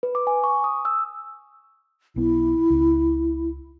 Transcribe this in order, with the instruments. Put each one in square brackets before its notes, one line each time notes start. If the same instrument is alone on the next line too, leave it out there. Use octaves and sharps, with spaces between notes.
[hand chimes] B4
D6
G#5
C#6
D#6
E6
[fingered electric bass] B1 B3 [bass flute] E4
[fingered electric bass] C#2 C4